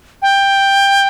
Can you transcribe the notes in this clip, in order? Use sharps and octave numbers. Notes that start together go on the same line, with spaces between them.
G5